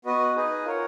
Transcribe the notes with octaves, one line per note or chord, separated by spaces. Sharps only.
B3 F#4 B4 D#5
D#4 G#4 B4 D#5
F4 A#4 C#5 F#5